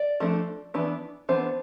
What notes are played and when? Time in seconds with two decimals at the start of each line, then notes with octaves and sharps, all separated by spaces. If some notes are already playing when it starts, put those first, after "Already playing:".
Already playing: D5
0.20 F3 A3 D4
0.74 E3 B3 D4
1.29 E3 B3 D4 C5